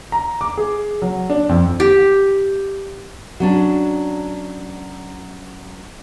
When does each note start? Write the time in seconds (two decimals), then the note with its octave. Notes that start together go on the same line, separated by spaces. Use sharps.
0.12 A#5
0.41 D6
0.57 G#4
1.02 F#3
1.30 D4
1.49 F2
1.80 G4
3.40 F#3 C#4 D4